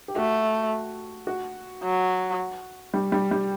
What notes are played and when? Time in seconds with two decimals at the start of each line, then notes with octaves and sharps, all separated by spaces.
0.08 G4
0.16 A3 F#4
1.27 F#4
1.83 F#3
2.94 G3
3.12 G3
3.31 G3